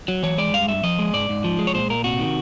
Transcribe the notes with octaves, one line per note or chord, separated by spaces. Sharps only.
F#3
E3 C#5
G#3 D5
G2 F5
G2 E5
F3 D#5
G#3
G#2 D5
G#2
F3
G#3
C#5
A#2 C5
A#2 A#4
C3 F#4
D#3